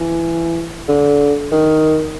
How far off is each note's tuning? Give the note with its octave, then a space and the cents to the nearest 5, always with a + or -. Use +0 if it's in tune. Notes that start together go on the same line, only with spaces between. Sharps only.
E3 +20
D3 -25
D#3 +5